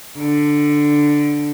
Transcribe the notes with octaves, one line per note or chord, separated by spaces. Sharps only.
D3